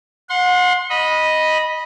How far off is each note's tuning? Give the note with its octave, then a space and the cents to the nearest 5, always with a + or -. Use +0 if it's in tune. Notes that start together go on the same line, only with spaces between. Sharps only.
F#5 -35 C6 +10
D#5 +0 B5 -15